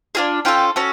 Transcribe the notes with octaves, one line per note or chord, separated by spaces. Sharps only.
D4 F4 G#4 G#5
C#4 F4 A4 G5
C#4 F#4 A4